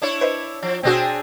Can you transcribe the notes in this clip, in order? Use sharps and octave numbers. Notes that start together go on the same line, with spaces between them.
D4 E4 C#5
B4 C5 D#5
F3
G#1 B2 C4 D4 F#4 G#4